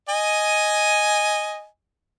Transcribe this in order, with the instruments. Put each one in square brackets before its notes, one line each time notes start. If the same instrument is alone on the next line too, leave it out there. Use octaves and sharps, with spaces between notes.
[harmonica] D#5 G#5